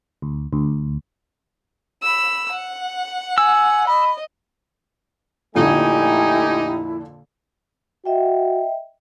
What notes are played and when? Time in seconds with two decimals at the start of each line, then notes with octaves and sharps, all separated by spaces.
0.22 D2
0.53 D2
2.03 B5 E6
2.52 F#5
3.38 G#5 E6
3.87 D#5 B5
5.55 F2 A#2 D3 A3 D#4 E4 G4 G#5
8.05 F#4 D#5 E5 G5